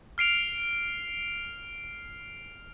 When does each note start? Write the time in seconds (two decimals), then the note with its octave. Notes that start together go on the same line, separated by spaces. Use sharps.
0.18 F6 C7 D7 F7